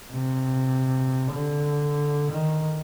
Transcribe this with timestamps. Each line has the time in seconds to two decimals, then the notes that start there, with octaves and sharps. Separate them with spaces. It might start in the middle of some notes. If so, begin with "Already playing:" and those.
0.13 C3
1.32 D3
2.31 D#3